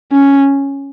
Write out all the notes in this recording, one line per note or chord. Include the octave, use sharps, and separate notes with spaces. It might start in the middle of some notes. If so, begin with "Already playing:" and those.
C#4